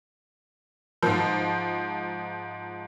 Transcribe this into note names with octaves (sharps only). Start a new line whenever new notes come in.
G#2 F3